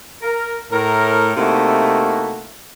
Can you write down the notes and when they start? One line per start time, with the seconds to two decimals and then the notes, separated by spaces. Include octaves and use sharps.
0.23 A#4
0.71 A2 A#4
1.36 C3 A3 A#3 D#4 E4 F#4